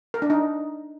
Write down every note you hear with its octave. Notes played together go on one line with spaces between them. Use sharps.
A#4
D4
D#4